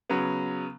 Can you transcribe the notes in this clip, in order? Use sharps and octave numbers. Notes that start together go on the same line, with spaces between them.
C#3 F#3 B3